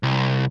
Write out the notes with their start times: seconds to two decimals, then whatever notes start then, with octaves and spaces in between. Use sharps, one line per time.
0.03 C2